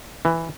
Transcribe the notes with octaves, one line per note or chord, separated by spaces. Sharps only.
E3